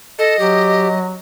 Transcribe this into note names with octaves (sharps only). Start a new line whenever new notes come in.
A4 D#5
F#3 G4